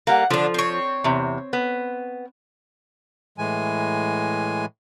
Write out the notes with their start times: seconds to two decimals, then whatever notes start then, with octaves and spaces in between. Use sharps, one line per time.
0.07 G3 A#3 F#5
0.30 D3 F3 D4
0.54 C4 C#5
1.04 E2 C3
1.53 B3
3.38 A2 E3 G#3 G#5